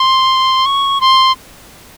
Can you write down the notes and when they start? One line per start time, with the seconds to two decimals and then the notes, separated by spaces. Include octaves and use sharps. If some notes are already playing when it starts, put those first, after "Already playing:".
Already playing: C6
0.66 C#6
1.01 C6